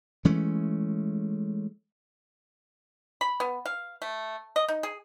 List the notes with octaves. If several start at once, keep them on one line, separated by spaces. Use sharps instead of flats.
E3 G#3 A3 C#4
B5
B3
F5
A3
D#5
D#4
G#4